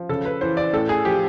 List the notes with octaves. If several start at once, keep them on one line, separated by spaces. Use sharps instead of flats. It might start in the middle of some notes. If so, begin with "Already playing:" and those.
Already playing: F3
C#3 A4
B4
E3 C5
D5
A2 A4
G#4
F3 G4